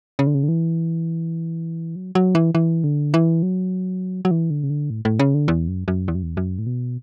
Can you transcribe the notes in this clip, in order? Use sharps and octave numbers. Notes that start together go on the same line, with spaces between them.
C#3
D3
C#3
D3
E3
F#3
F#3
E3
E3
D3
E3
F#3
F#3
E3
D3
C#3
D3
A2
A2
C#3
D3
E2
F#2
F#2
E2
F#2
E2
F#2
A2
B2